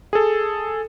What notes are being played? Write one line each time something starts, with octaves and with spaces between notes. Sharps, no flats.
G#4 A4